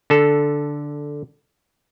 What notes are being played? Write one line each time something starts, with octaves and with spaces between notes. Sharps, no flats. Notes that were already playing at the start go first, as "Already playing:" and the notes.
D3 A4